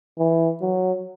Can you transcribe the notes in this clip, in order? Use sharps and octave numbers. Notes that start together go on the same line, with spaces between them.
E3
F#3